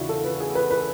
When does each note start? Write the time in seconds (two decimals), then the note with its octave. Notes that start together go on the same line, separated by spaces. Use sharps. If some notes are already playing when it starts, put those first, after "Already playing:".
Already playing: E2 C#3 D4 E4 F#4
0.09 A4
0.25 B4
0.40 G#4
0.55 B4
0.71 B4